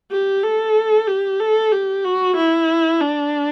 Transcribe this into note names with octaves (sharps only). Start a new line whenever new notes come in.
G4
A4
G4
A4
G4
F#4
E4
D4